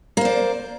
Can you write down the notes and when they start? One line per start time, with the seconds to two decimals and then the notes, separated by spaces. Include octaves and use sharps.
0.17 A#3
0.21 C5
0.25 D5